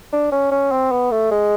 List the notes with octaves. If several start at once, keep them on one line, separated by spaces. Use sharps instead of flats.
D4
C#4
C#4
C4
B3
A3
G#3